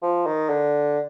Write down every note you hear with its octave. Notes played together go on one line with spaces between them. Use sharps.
F3
D#3
D3